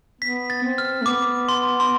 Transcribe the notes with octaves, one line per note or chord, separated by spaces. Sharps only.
B3 B6
A6
C4
F6
A3
B3 D6
C6
C6